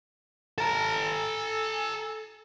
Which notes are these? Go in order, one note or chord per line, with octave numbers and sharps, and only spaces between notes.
A4 A#5